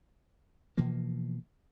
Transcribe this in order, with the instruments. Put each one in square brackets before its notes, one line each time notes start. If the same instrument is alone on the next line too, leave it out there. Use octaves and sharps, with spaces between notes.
[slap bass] B2 E3 F3 A#3